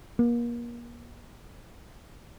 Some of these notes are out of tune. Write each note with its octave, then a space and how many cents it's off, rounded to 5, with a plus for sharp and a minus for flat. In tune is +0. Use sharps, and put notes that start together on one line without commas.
A#3 +35